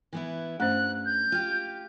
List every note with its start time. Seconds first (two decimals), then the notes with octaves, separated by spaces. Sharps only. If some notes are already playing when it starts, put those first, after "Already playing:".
0.13 E3 B3 E4
0.60 G2 A3 C#4 C5 F#6
1.05 G6
1.32 F4 G4